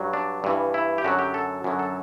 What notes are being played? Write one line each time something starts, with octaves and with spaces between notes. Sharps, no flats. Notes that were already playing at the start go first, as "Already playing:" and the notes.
Already playing: G2 F#3
D4
G2 E3
E4
G4
F#2 D3 F#3 F#4
G4
A4
F#2 D3 F#3
A4